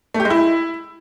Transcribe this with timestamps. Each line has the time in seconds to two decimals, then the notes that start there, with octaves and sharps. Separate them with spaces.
0.14 A3
0.20 G4
0.25 G#3
0.30 E4